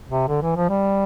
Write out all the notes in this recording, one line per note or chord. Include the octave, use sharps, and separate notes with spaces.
C3
D3
E3
F3
G3